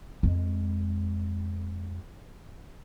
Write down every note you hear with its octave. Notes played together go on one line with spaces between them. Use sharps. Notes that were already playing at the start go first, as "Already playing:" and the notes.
F2 G#3